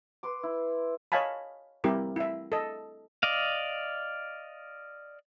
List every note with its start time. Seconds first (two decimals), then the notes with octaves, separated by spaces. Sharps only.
0.23 B4 C6 D6
0.43 E4
1.12 C#5 D#5 F5 G#5 A5 B5
1.84 G3 C4 E4 G4 A#4
2.16 E4 E5
2.52 A4 D#5
3.23 D5 D#5 F5